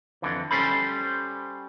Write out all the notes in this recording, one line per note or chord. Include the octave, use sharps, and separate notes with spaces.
F2 D3 E3
G3 C#4 A4 C5 B5